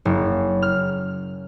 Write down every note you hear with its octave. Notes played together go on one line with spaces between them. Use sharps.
F#1
F6